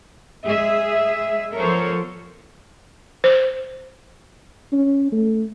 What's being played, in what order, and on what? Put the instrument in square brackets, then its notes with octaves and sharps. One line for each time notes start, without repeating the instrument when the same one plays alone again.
[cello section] G#3 G#4 E5
F3 B3 A4 A#4 C5 C#5
[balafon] C5
[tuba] C#4
A3